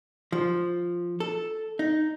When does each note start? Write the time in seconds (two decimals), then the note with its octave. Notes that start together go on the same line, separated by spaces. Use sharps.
0.32 F3
1.20 A4
1.79 D#4